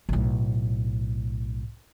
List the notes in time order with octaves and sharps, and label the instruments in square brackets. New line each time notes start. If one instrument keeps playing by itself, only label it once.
[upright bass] B1 A2